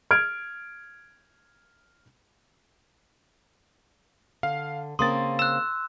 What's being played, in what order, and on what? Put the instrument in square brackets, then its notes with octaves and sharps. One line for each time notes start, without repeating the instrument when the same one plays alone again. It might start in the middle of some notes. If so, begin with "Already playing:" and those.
[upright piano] F6 G#6 D7
[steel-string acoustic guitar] D3 [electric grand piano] F5
[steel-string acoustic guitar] C#3 A#3 C4 [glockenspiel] C6 [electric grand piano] D#6 A6
[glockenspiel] E6 F#6 [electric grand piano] E7